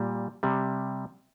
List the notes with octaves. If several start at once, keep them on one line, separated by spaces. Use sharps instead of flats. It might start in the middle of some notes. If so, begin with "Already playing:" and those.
Already playing: A#2 G3
C3 G3